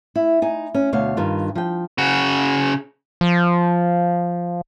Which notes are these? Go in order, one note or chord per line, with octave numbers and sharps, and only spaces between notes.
E4
D#4 G#5
C#4
D2 B2 C#5 F5
G2 D#3 F4
F3 G5
C#3 F#4
F3